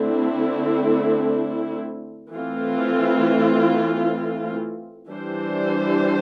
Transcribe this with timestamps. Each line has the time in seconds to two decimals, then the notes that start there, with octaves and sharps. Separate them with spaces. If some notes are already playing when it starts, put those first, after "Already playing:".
Already playing: D3 A3 C4 E4
2.31 E3 A3 C4 F4
5.09 E3 G3 D4 G4 C5